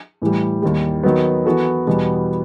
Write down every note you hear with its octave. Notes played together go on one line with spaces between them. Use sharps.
A2 E3 G3
D#2 D#3 G3
D#3 F#3 B3
E3 B3 F#4 A4
E2 B2 G3 B3